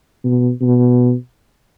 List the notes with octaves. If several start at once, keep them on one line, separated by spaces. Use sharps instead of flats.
B2
B2